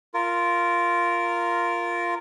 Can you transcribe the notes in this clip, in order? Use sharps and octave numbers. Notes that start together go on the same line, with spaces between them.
F4 A#4